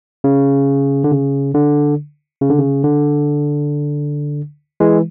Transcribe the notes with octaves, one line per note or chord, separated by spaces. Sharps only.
C#3
D3
C#3
D3
C#3
D3
C#3
D3
E3 G#3